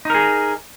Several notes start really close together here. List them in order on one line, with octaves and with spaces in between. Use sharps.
D#4 A#4 G#4